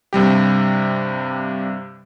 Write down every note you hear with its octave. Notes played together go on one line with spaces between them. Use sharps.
G2 C3 G3 G4